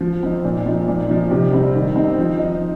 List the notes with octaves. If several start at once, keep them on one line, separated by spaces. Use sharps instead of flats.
F3
C4 D#4
A#2
F3 C4 D#4
A#2
F3 D#4
C3
G3 C4 D#4
D#3
C4 D#4
F3
D#4